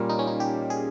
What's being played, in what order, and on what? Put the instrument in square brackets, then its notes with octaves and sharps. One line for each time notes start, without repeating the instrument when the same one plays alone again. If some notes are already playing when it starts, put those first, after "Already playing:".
Already playing: [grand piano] A#2 G3 A#3 [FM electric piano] C#4
[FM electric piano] D#4
C#4
D#4
G4
G#4